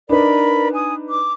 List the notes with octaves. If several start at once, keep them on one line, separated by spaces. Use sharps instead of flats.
D4 D#4 A#4 B4 D5 B5
G#5 D#6
D6